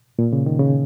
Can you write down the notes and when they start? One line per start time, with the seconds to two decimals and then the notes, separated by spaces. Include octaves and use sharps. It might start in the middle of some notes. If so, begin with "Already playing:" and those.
0.19 A#2
0.33 C#3
0.46 D#3
0.59 C#3